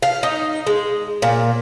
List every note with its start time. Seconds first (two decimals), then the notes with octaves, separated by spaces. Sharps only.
0.02 F5
0.23 D#4
0.67 G#3
1.22 A#2